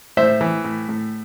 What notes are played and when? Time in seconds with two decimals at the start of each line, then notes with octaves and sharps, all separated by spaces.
0.17 A2 C5 E5
0.41 E3
0.65 A2
0.89 A2